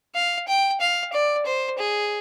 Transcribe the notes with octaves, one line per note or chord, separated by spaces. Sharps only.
F5
G5
F5
D5
C5
G#4